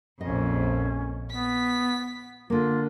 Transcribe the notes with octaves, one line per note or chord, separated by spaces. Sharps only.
A#1 F2 C#4 D#5
B3 B6
D3 A#3 F4